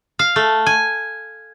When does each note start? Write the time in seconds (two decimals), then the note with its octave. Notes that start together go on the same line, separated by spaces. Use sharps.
0.19 F5
0.36 A3
0.66 G#5